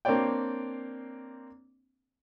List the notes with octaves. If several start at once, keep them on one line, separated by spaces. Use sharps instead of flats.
A#3 C4 D4 C#5 D5 G5